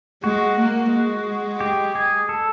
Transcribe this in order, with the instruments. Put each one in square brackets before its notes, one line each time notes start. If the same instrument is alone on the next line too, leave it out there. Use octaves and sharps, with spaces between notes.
[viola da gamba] G#3 [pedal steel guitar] F#4
[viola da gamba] A#3
G#3
[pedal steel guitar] G4
G#4
A4